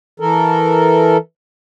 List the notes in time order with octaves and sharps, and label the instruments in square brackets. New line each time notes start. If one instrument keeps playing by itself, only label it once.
[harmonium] E3 A4 A#4